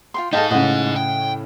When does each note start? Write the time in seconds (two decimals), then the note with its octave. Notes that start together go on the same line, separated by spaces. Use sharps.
0.14 F4 G5 C6
0.33 D#4 G#4 A4 D#5 F5 G5 A5
0.51 A2 C#3 D#5 F#5
0.96 G5